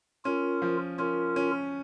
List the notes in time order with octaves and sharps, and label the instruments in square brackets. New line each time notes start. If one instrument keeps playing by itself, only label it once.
[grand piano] C#4 [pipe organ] F4 A#4
[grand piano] F3
[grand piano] C#4 [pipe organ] F4 A#4
[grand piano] C#4